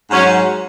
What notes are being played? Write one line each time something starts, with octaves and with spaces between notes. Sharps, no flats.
G#2 F#3 C#4